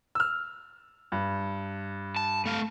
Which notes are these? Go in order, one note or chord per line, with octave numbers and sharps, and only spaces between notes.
E6 F6
G2
A5
A3 F5